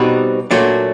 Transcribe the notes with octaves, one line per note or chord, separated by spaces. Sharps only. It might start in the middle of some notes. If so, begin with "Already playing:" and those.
Already playing: B2 G3 C4 D#4 F#4
A#2 F#3 A3 D4 F#4